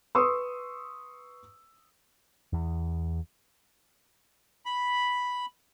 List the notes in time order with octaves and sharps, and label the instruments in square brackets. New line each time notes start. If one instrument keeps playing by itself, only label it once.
[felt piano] B4 C6 C#6 D#6 E6
[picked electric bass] E2
[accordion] B5